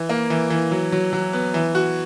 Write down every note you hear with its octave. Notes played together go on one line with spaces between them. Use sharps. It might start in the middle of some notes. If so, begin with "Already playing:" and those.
Already playing: E3
A#3
E3
E3
F#3
F#3
F#3
B3
E3
F#4